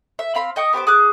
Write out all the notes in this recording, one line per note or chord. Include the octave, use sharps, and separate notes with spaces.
E5
C4 F5 B5 C6
D#5 G5 C#6 D#6
B3 G4 C5 D6
G#4 D6 F#6